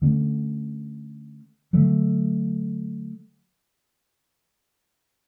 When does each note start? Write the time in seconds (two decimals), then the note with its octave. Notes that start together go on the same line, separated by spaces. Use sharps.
0.02 D3 A3 C#4
1.73 D3 F#3 A3